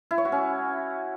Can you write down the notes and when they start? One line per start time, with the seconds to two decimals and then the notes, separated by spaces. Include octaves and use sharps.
0.11 E4
0.18 C#5
0.25 F#4
0.32 C#4